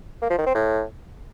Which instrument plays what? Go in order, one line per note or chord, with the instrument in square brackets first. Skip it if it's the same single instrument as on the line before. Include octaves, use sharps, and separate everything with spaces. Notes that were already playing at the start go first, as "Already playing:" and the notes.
[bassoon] A#3
F3
D#3
C4
A2